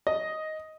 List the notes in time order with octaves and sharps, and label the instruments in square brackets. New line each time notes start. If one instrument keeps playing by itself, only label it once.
[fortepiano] D#5